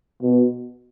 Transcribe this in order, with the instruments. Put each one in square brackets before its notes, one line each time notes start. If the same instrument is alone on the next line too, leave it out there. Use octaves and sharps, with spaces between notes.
[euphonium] B2